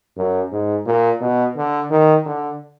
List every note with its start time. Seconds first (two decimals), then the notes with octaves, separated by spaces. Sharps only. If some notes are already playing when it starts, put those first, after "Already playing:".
0.17 F#2
0.52 G#2
0.86 A#2
1.21 B2
1.57 D3
1.90 D#3
2.26 D3